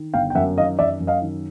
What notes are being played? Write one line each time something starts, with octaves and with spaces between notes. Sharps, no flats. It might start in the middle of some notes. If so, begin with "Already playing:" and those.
Already playing: D#3
G1 F5 G5
G5
F#2 E5 F#5
D#3 D#5 F5
F#2 D5 E5
F#2
D#5 F5
D#3